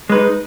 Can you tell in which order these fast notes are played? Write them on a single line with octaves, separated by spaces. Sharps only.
G#3 B4 D#4